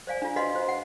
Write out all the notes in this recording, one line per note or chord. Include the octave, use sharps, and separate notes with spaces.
C5 D5 F5 G#5
D4 F4
F#4 B4 D#5 F5 B5 C6
C5
F#5